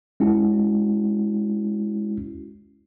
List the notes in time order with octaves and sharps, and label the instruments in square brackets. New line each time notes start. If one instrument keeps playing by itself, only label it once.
[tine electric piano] G#3 C#4 E4 F#4